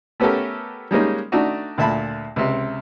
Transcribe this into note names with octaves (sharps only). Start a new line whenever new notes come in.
A3 B3 C#4 G4 A4 A#4
G3 G#3 A#3 C#4 D#4
A3 D4 D#4 F#4
D2 A#2 E5 A5 B5
C#2 C3